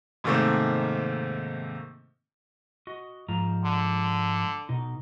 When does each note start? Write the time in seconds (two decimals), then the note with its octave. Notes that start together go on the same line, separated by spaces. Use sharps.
0.24 G#2 C3 D#3 A3 A#3 C4
2.87 F#4 D#5
3.29 G#2 F3 A#5
3.64 D3
4.69 B2 D#4